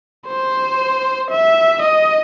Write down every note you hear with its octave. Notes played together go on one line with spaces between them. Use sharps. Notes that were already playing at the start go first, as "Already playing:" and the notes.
C5
E5
D#5